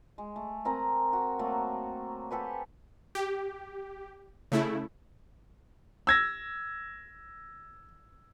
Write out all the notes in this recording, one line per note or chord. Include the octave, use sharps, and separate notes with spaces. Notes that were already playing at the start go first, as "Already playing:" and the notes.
G#3
A3
C4 A#4 G#5 A#5
F#4
F#3 A3 A#3
G4 A4 B4 G#5
G4
C#3 A3 E4
E6 G#6 A#6